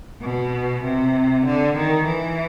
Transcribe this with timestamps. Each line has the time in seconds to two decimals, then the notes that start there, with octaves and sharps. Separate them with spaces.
0.21 B2
0.84 C3
1.45 D3
1.76 D#3
2.06 E3